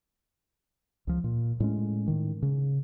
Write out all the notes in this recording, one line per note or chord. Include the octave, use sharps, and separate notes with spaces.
C#2 F3
A#2
A2 G#3 C#4
A2 D#3
C#3